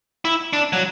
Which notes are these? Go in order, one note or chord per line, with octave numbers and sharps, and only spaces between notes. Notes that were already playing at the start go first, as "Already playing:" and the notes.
E4
D4
F#3